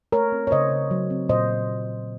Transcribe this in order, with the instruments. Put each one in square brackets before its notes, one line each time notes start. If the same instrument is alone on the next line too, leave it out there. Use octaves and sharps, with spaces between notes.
[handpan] A3 A#4 C#5
C4
C#5
C#3 C5 D#5
C#3
F#3
C4
A#2 C5 D#5